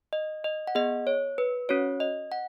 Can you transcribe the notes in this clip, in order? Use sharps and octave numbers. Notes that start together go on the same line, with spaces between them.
D#5
D#5
F#5
B3 G#4 D#5
C#5
B4
C#4 F#4 C#5
D#5
F#5